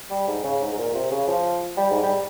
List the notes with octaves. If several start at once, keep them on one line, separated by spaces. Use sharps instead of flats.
G3
G#2
C#3
G#2
G#2
A#2
C3
C#3
F3
G3
G#2
G3